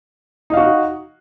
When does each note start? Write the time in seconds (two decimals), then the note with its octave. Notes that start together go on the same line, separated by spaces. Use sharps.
0.50 D#4
0.54 F5
0.57 F#4